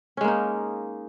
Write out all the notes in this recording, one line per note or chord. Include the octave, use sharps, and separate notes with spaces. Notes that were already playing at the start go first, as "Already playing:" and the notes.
G#3 A#3 C#4 D#4